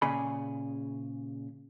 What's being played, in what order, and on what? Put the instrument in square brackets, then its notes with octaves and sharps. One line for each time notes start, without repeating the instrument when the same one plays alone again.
[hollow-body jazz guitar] A#2 C#3 G#4 B5